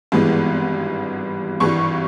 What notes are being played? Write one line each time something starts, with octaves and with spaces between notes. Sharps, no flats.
G#1 G2 E3 G#3 B3
G#1 G2 E3 G3 C#6